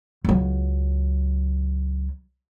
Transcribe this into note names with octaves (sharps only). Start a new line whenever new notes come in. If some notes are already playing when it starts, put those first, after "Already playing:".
C#2 F#3